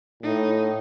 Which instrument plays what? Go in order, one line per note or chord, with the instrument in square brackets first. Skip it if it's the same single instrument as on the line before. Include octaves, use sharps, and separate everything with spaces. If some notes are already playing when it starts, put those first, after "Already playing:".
[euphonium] A2 [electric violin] D#4